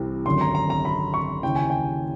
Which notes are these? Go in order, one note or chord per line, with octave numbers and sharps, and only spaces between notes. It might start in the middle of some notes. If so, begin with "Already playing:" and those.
Already playing: C2 C3 E3
G#1 F#2 D3 C6
A#5
A#5
A#5
B5
C#6
D#2 C#3 E3 G5
G#5
G5